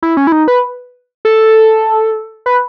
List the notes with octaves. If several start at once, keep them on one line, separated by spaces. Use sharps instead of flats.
E4
C#4
E4
D#4
B4
A4
B4